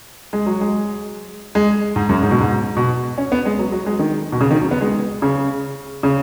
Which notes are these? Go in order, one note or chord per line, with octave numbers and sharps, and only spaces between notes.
G#3
F#3
G#3
G#3
G#2
F#2
G#2
B2
G#2
B2
C#4
B3
G#3
F#3
F#3
G#3
D#3
B2
C#3
D#3
F#3
B3
G#3
C#3
C#3